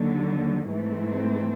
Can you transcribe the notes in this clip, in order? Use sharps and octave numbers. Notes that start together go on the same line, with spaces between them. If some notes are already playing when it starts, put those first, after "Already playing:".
Already playing: D#2 D3 F#3
G#2 E3 A3 C4